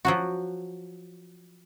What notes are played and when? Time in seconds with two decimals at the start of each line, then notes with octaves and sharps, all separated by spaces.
0.05 F3 F#3 F#4